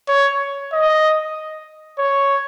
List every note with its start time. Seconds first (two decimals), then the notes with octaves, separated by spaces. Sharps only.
0.08 C#5
0.72 D#5
1.98 C#5